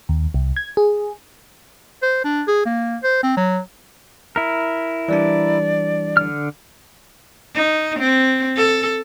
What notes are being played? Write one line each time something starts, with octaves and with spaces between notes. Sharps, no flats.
D#2
C2
G#6
G#4
C5
D4
G#4
A#3
C5
C4
F#3
E4 A#4
E3 G3 D4 D5
D3 F6
D#4
C4
A4